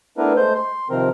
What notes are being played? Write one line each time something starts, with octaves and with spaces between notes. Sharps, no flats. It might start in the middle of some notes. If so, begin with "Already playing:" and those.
A3 B3 D4 E4 A#4 B4
G#3 A3 C5 G6
C6
C3 D#3 F3 C4 A#4